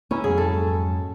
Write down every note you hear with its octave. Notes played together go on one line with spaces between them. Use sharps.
A#3 B3 C#4 E4
F2 G#2 F#3 G#4
A4